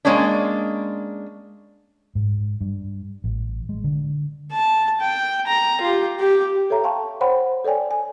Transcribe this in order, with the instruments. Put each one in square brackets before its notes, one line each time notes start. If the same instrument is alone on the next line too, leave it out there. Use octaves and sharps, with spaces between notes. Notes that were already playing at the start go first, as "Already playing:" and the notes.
[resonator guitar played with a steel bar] G#3 A#3 C#4 D4
[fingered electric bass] G#2
G2
A1
G#3
D3
[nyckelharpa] A5
G5
A#5
F4 G4
G4
[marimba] A4 C#5 E5 A#5
F5 G5 A5 C6 C#6
C5 C#5 F#5 G5 B5 C6
A4 C#5 D5 G5 G#5
G#5